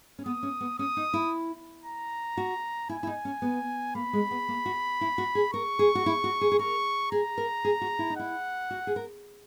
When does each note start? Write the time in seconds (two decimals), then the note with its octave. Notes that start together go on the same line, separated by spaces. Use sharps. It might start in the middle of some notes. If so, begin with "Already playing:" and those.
0.19 C#4
0.26 B3 D#6
0.43 C#4
0.61 B3
0.79 C#4 D#6
0.97 D#4
1.14 E4
1.85 A#5
2.37 F#4
2.89 E4 G#5
3.03 E4
3.07 D#4
3.25 C#4
3.42 B3
3.95 A#3 B5
4.13 G#3
4.31 B3
4.48 A#3
4.66 F#4
5.01 E4
5.18 F#4
5.35 G#4
5.53 A#4 C#6
5.79 G#4
5.95 F#4
6.06 E4
6.24 F#4
6.41 G#4
6.52 G#4
6.59 A#4 C#6
7.11 G#4 A#5
7.38 A#4
7.65 G#4
7.81 F#4
7.99 E4
8.10 D#4
8.17 E4 F#5
8.71 F#4
8.87 G#4
8.96 A#4